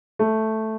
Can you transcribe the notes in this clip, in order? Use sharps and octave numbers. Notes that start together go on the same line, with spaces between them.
A3